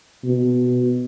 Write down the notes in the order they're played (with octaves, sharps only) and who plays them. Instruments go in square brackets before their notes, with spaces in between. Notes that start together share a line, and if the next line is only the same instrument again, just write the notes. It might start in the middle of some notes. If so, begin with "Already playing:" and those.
[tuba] B2